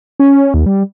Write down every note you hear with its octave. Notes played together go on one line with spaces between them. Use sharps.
C#4
D#2
G3